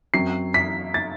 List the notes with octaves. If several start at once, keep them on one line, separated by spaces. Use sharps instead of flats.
F#2 F#3 C4 C7
B6
A6